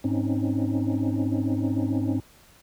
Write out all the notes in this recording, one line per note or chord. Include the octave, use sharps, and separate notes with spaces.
G#2 C4 C#4 D#4